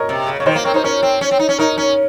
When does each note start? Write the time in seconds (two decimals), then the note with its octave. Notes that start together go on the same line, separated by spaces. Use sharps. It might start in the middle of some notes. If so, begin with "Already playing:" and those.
Already playing: A#4 C#5 D#5
0.09 C3
0.27 C#3
0.40 C#3 C#5
0.46 D#3 C5 D#5
0.55 A#3
0.64 C4 A#4 C#5
0.74 D#4 C5
0.84 C#4 A#4 C#5
1.03 C4
1.21 C#4
1.31 C4
1.39 D#4
1.49 C#4
1.58 D#4 A#4 C#5
1.78 C#4